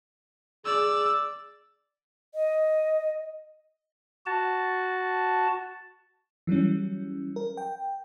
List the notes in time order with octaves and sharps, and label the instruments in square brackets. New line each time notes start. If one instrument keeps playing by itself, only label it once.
[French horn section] G#4 [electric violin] D5 E6
[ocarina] D#5
[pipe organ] F#4 A5
[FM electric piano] E3 F#3 G3 C#4
A#4
G5